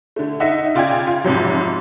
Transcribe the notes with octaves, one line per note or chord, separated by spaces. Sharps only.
D3 A3
D#4 D#5 E5 F#5
C#3 F4 D5 G5 G#5 G#6
F4
F2 G#2 C3 F3 F#3